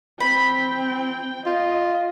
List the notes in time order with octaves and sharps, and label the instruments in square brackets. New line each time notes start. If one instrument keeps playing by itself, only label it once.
[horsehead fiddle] C4 G5 [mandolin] B5
[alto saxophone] F4 [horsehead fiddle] D#5